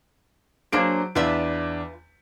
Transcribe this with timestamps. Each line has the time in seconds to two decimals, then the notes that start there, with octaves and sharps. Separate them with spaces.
0.72 F#3 A#3 D4 G#4 C5 D7
1.15 E2 D4 F4 B4 E5